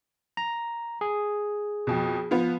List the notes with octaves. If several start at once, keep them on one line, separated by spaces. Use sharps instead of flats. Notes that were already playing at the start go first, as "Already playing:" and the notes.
A#5
G#4
F2 B2
F3 B3